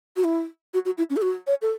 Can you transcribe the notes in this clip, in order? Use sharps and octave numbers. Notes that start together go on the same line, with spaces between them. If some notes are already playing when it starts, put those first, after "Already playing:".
F#4
E4
F#4
F#4
E4
C#4
A4
F#4
C#5
A4